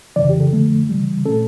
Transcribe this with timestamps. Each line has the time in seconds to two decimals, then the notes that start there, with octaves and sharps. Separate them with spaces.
0.16 F2 C#3 E3 D5
0.30 G4
0.40 A4
0.53 F2 D3 F3 A3
0.89 C#3 E3 G3
1.25 A#2 A3 C#4 A4